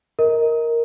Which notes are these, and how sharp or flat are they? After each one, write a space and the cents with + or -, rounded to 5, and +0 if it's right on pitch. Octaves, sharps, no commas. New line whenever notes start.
A#4 +0 D#5 +25